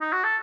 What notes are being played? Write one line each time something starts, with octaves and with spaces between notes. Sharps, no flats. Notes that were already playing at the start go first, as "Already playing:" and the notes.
D#4
F#4
A4